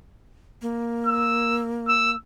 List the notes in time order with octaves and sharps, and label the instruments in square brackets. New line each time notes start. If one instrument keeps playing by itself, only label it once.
[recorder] A#3
[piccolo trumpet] E6
E6